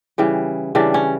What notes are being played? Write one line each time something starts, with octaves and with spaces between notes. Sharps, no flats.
C#3 E3 G3
C#3 E3 G3 D4
C#4